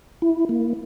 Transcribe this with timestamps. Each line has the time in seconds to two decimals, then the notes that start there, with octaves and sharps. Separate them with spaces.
0.22 E4
0.49 A#3